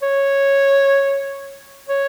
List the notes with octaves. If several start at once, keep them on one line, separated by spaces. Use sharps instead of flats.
C#5
C#5